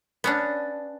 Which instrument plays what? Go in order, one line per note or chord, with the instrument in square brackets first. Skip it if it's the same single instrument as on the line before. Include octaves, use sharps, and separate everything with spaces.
[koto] B3 C#4 D4